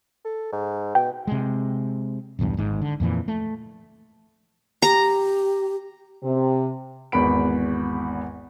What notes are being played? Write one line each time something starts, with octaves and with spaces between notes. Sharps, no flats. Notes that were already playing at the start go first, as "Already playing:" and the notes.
A4
G#2
B2 G5
C3 G#3
D1 B1 E2 G2
G#1 G#2
D3
F2 A#2 D#3 E3
A3
G4 A#5
C3
G#1 E2 B3 B5 D7